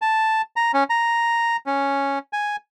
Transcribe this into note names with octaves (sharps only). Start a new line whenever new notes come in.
A5
A#5
C#4
A#5
C#4
G#5